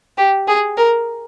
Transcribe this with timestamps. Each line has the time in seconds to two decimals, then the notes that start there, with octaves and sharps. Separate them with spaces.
0.18 G4
0.48 G#4
0.77 A#4